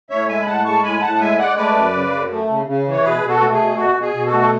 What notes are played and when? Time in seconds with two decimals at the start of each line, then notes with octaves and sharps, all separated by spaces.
0.10 A2 C#5 E5
0.28 G#3 E5 G#5
0.42 B5
0.46 A2 F#5 A5
0.64 G#3 A5 C#6
0.83 A2 G#5 B5
0.97 B5
1.01 A2 F#5 A5
1.15 F#5
1.20 G#3 E5 G#5
1.38 G#3 D5 F#5
1.56 A3 B4 D5
1.75 F#2
1.94 C#3
2.12 F#2
2.30 A3
2.49 C#3
2.67 C#3
2.85 E3
2.92 C#5
3.03 B2 G#4 B4
3.22 B2
3.28 F#4 A4
3.40 A3
3.52 G#4
3.59 B2
3.77 B2 F#4
3.96 B2
4.01 G#4
4.13 B2
4.26 F#4 A4
4.32 A3
4.40 A4